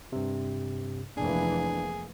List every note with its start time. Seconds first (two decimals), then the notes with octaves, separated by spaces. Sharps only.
0.12 G2 C3
1.17 F1 E3 A#3 D4 G#4